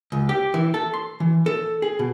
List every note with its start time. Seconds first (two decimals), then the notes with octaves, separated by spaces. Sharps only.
0.12 C#2
0.29 G4
0.54 E3
0.74 A4
0.94 C6
1.20 E3
1.46 A4
1.82 G#4
1.99 B2